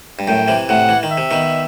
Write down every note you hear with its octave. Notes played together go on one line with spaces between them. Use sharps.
G2
F#2 A2 G5
C3 E3
A2 C3 F#5
E3
D#3
E5
C3
B2 D#3